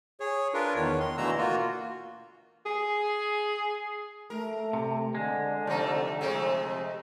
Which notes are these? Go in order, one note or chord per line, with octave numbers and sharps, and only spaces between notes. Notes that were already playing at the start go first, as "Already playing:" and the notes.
G#4 C#5
D4 F4 A#4 B4
E2 D#3 C#5
C6
B2 D3 E3 A3 A#5 E6
A#3 F4 F#4
G#4
A3 A#4
C3
D3 G#3
C3 F3 A3 D#4
C3 G#3 A3